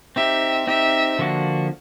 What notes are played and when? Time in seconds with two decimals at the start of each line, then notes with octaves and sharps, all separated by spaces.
0.16 C4 D#4 G4 E5
0.67 C4 D#4 G4 E5
1.19 D3 F3 A#3 D4 F#4